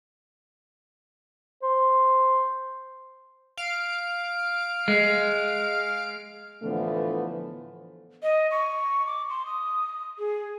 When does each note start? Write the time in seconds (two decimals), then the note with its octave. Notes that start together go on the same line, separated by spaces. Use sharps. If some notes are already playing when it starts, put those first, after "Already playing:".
1.63 C5
3.57 F5 D7
4.88 G#3
6.63 A2 D3 E3 F3 A3 B3
8.23 D#5
8.51 C#6
9.06 D6
9.30 C6
9.46 D#6
10.19 G#4